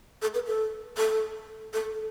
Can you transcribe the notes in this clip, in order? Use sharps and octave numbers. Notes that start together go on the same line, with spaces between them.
A4
B4
A4
A4
A4
A4